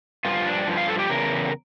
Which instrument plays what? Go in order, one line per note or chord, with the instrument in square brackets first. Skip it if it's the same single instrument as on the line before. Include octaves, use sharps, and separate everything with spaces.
[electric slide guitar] G2 F3 F4
D4
G2 F3
F5
A4
G4
E2 C#3 A#4